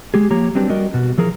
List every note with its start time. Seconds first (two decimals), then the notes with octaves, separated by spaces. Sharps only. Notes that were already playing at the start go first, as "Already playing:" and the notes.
0.14 G#3 G4 G#4
0.31 F3 A#3 G4 C#5 A#5
0.55 F#3 G3 C4 D4 G4 B4
0.70 G3 F#4 A#4 D5 D#5
0.94 B2 F#4
1.18 E3 F3 G#4 A#4